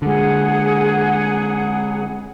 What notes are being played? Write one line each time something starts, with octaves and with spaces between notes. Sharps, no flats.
D3 G#3 G#4 F#5